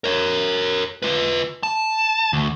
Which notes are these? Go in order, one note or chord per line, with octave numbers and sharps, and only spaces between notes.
A#4 C#5
F4 B4
A5
D2